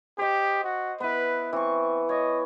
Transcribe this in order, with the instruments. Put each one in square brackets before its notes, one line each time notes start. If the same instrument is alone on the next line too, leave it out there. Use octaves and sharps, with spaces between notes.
[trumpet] G4 [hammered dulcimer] C5 D#5
[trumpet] F#4
[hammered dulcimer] B3 E4 [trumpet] B4
[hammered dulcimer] E3 C#6 [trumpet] C4
[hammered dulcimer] C#5 [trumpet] D#5